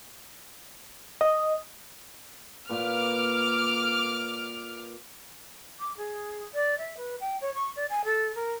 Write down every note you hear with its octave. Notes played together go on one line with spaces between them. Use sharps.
D#5
A#2 B4 D6 F6
D6
G#4
D5
E5
B4
G5
C#5
C#6
D5
G#5
A4
A#4